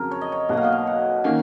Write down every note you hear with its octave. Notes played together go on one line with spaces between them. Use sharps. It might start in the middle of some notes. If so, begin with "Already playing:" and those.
Already playing: F2 C#3 F#3 A#4
C#5
D#5
C#5
B1 B2 A#3 F#5
F5
D#5
F5
F#5
D#3 A#3 C#4